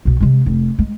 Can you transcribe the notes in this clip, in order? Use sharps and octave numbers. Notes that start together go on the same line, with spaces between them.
B1 B2
C3 G#3
F1
G#3